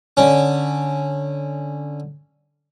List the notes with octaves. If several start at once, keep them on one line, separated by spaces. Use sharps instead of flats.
D3 C#4